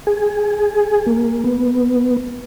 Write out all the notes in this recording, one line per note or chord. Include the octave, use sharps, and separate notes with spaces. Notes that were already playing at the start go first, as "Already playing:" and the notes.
G#4
A#3
B3